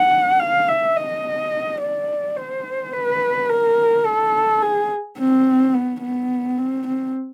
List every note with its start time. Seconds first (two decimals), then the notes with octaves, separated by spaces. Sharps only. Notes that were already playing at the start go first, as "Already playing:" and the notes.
Already playing: F#5
0.40 F5
0.68 E5
0.97 D#5
1.80 D5
2.37 C5
2.93 B4
3.49 A#4
4.06 A4
4.62 G#4
5.18 C4
5.74 B3
6.02 B3
6.59 C4
6.87 C4